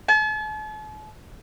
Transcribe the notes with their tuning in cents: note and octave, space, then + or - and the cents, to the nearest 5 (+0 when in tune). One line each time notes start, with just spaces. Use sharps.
A5 -45